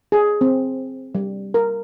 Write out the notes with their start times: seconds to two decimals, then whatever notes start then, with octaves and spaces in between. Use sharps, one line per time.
0.12 G#4
0.41 C4
1.15 G3
1.54 A#4